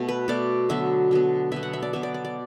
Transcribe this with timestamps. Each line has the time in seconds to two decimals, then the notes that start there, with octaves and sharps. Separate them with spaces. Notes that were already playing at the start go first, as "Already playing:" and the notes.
Already playing: B2 A3
0.08 B4
0.28 B2 A3 D5
0.69 D3 F#3 B3 E5
1.11 D3 F#3 B3
1.52 B2 F#3 B3 E5
1.63 F#5
1.73 E5
1.83 D5
1.93 B2 F#3 B3 E5
2.03 D5
2.14 D5
2.25 D5